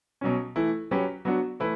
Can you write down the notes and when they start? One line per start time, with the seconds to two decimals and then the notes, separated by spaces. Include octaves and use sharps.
0.21 B2 F#3 C#4
0.56 E3 A3 E4
0.91 F#3 C#4 G4 B4
1.25 F#3 B3 D4 F#4
1.60 E3 A3 E4 B4